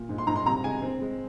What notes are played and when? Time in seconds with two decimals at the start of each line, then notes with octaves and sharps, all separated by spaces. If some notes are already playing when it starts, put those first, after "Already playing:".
Already playing: A#2
0.09 G#2
0.18 C6
0.27 G#2 A#5
0.36 C6
0.46 C3 A#5
0.64 G#3 G#5
0.82 C4
1.01 G#3